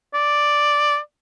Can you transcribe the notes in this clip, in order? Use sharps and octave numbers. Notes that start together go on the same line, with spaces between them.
D5